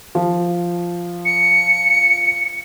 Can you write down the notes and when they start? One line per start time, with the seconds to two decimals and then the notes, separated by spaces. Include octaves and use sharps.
0.15 F3
1.25 C#7